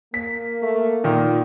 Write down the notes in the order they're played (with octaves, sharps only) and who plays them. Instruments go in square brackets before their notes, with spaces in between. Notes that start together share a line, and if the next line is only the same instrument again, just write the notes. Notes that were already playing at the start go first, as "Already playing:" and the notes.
[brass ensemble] A#3 [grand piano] B6
[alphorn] A3
[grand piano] A#2 D#3 [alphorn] F4